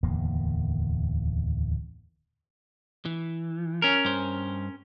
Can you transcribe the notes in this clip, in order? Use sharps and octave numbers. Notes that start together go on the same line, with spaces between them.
D1 E2 D#3 A#3
E3
C#4 A#4
G2 C5